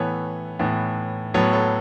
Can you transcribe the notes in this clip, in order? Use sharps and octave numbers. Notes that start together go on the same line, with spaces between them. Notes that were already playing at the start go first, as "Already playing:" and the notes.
Already playing: A2 E3 B3 A4 C#5
A2 E3 B3
A2 F#3 B3 A4 C#5
A4 C#5